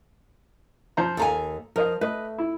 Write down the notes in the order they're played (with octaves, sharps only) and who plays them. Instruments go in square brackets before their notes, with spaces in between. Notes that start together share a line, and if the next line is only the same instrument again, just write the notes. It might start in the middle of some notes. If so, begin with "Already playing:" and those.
[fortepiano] F3 C5 A#5
[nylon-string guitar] D#2 F5 G#5 [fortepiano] A4 A#5
[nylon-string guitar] F3 [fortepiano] A#4 D#5 F5
[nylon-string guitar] A3 [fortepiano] B4 D#5
[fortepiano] E4